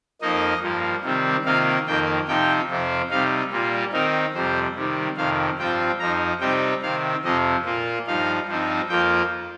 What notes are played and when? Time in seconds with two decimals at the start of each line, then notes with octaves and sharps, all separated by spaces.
0.21 F2 F3 A#3 D#4 D#5
0.62 G2 F3 A#3
1.03 C3 D#3 G3 C4
1.44 C3 D#3 A#3 F4 F5
1.87 F2 D#3 A#3 G5
2.27 C3 F3 D#4 G5
2.69 F2 C3 F3 C4
3.10 C3 G3 D#4 F5
3.51 A#2 G3 A#3 F4
3.92 D#3 C4 D#4 A#4
4.34 F2 C3 G3 C5
4.75 C3 D#3 G3
5.17 F2 C3 D#3 F5
5.58 G2 F3 C4 F4 G5
5.99 F2 F3 D#4 A#5
6.40 C3 G3 C4 D#4 G5
6.82 C3 D#3 C4 F5
7.23 F2 C3 F3 D#5
7.65 A#2 A#3 F4
8.07 G2 F3 D#4 F5
8.47 G2 F3 C4 D#4
8.89 F2 F3 A#3 F4 G5